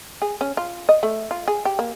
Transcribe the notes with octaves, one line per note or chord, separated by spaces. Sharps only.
G#4
C#4
F4
D#5
A3
F4
G#4
G4
A#3